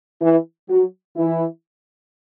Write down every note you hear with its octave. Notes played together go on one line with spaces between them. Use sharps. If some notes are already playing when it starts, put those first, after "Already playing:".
E3 E4
F#3 F#4
E3 E4